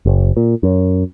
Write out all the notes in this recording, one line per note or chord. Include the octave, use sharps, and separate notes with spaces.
F#1
A#2
F#2